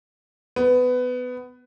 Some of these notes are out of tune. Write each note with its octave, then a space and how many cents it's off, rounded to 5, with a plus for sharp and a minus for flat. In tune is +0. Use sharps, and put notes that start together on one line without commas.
B3 +20